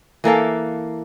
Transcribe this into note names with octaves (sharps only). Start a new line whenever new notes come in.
E3 A#3 A4 F5